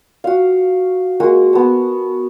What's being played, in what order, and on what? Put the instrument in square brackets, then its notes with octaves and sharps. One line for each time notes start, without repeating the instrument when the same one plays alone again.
[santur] F#4 F5
G#3 A#3 F#4
B3 A5